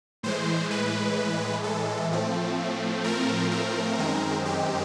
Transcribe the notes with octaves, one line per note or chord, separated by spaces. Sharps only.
A2 E3 G#3 C5
B4
A4
A2 F3 A3 C4
A#4
A#4
F#2 D#3 G#3 C4
G4